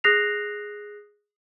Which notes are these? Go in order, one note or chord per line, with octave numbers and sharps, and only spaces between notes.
G#4 D#6 F#6 A#6 C7 F7